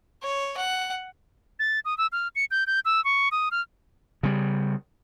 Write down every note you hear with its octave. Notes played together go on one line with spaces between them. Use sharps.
C#5
F#5
A6
D#6
E6
F6
C#7
G6
G6
E6
C#6
D#6
F6
C#3 G3